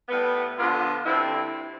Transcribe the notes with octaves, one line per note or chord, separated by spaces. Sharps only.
A2 G3 B3
D3 F3 B3 F4
D3 G3 C4 E4